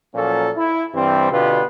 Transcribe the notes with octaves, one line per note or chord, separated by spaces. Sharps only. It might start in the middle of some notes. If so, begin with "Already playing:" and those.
A#2 F3 F#3 A#3 C#4 A4
E4
G2 E3 G3 C4
B2 D3 B3 F4 G4 B4